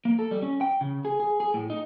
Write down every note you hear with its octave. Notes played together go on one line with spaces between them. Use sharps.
A#3
A4
G3
C#4
G5
C#3
G#4
G#4
G#4
A2
D#4